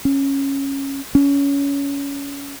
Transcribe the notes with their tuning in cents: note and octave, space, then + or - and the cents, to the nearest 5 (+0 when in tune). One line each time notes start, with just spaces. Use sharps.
C#4 -10
C#4 +20